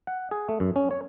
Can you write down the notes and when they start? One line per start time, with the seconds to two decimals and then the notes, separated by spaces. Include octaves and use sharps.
0.07 F#5
0.31 G#4
0.49 A3
0.60 F#2
0.76 C#4
0.91 C#5